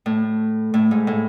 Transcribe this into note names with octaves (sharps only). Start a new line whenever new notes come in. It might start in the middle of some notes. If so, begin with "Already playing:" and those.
A2
A2
G#2
A2